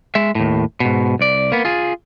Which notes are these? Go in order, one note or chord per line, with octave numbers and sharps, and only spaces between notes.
G#3 E5
D#2 A2
G#2 B2
C2 D5
A#3 B3
F4 G#4